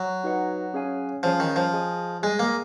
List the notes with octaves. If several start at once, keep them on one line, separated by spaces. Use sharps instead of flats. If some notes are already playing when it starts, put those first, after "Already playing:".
Already playing: F#3
D#4 F#4 B4 D#5 F#5
C#4 G#4 C#5 F5 G#5
F3 C#4 G#4 C#5 F5 G#5
D#3
F3
G#4 D#5 G#5
G#3 G#4 D#5 G#5
A#3